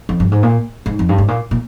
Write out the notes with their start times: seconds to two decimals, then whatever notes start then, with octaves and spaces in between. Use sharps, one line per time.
0.09 F2
0.20 G2
0.32 G#2
0.43 A#2
0.86 G#2
0.99 F2
1.09 G2
1.18 G#2
1.28 A#2
1.51 A#2